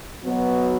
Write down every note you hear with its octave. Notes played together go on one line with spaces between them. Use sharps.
B2 F#3 B3